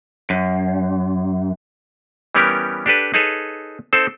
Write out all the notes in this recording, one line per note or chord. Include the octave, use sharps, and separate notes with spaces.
F#2
E3 G3 B3 C#4 G4 A#4
D4 G4 A4 B4
D#4 G#4 A4 B4 C#5
C4 D#4 A4 C5